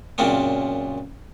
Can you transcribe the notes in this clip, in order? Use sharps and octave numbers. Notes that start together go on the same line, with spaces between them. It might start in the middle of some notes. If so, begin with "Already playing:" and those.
F#2 A#2 C#3 A#3 C4 D4